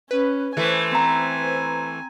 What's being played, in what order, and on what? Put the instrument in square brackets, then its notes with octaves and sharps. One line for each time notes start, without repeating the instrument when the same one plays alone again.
[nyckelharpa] C#4 [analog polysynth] B4
[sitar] E3 A3 [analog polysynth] B4 C5 [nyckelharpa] G#5
[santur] C4 A#5